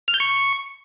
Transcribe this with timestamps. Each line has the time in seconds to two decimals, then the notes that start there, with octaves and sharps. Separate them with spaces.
0.08 F6
0.14 G6
0.20 C#6